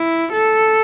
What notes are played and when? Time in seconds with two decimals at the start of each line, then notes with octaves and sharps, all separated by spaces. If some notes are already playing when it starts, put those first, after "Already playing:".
Already playing: E4
0.32 A4